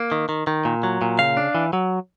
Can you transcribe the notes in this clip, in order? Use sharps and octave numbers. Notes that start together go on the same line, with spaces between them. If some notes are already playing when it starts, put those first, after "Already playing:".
Already playing: A#3
D#3
D#3
D#3
A#2
F#3
A#2
C#3 F5
D4
E3
F#3